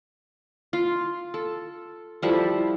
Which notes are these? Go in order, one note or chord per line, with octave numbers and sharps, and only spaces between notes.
F4
A4
F3 G3 E4 A4